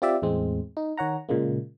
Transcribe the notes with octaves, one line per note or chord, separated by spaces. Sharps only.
C4 F4 G4 D5 E5
E2 A2 G#3 C4
D#4
D#3 C#5 F#5 A#5
A#2 C#3 G#3 A#3